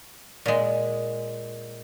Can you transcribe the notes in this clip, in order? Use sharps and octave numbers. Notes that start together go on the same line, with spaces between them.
A#2 G#3